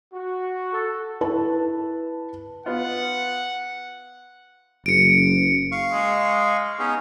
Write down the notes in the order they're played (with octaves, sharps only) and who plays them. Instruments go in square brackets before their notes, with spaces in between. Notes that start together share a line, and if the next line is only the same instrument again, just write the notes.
[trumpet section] F#4
A4
[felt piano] E4 B4 A5
[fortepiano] B3 F4 [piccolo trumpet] F#5
[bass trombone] F#1 [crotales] C#7 D7
[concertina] F5 C#6
[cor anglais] G#3
[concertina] B3 D#4 G#4 [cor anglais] C#4